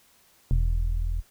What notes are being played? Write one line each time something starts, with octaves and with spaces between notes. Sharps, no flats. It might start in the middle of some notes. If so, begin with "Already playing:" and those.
E1